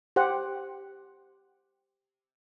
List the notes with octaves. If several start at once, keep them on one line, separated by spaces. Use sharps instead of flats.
G4 C5 F#5